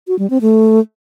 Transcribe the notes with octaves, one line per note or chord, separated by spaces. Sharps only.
F#4
G3
C4
A3